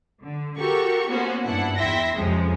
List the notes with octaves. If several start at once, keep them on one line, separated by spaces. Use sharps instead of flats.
D3
F#4 G4 A4 A#4 C#6
A#3 B3 C#4 F#4 C5
G2 D4 E4 F#5
E2 E4 E5 G5 C6 A#6
F2 C3 F3 G#3 C#4